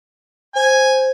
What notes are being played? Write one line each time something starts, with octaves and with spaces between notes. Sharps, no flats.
C5 G#5